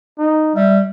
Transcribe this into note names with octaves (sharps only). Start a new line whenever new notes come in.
D#4
G3 E5